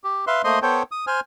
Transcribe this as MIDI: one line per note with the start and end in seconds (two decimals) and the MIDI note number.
0.04 0.25 67
0.27 0.42 71
0.27 0.42 76
0.27 0.42 77
0.27 0.42 84
0.44 0.59 57
0.44 0.59 58
0.44 0.59 72
0.44 0.59 75
0.44 0.59 84
0.62 0.83 59
0.62 0.83 69
0.62 0.83 72
0.62 0.83 73
0.62 0.83 79
0.92 1.05 87
1.07 1.20 72
1.07 1.20 80
1.07 1.20 89